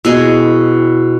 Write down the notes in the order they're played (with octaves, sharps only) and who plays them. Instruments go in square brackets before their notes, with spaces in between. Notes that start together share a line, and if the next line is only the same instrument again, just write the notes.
[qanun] B2 G#4 D#5 [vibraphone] E4